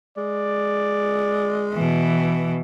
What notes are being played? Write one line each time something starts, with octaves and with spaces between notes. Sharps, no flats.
G#3 D5
B2 E3